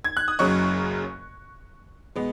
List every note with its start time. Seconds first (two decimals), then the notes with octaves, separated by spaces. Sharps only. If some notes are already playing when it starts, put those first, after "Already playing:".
0.04 G#6
0.17 F#6
0.28 D#6
0.39 F#1 F#2 C#3 F#3 C#6
2.16 B2 G#3 B3